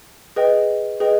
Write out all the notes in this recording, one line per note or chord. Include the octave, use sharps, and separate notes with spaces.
G#4 B4 D#5 G5
G#4 B4 D#5 G5